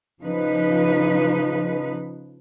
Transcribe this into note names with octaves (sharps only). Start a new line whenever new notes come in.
C#3 F3 D#4 B4